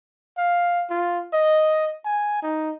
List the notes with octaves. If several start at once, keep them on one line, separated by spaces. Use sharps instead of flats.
F5
F4
D#5
G#5
D#4